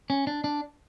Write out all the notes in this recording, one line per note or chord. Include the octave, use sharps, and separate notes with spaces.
C#4
D4
D4